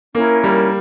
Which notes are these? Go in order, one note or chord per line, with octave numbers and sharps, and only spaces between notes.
A#3 C#4 E4 A#4
G3